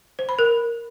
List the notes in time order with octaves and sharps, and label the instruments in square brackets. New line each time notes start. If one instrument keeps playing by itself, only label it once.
[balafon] C5
B5
A#4